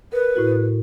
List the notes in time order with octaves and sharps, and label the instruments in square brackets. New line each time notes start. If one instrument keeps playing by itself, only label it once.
[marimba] A#4 [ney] B4
[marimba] A2 E4 F#4